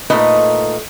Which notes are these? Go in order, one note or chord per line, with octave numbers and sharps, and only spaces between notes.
A#2 A3 D#4 B4 D#5